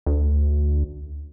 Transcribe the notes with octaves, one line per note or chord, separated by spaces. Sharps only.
D2